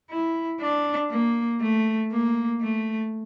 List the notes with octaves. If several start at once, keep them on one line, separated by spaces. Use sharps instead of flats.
E4
D4
A#3
A3
A#3
A3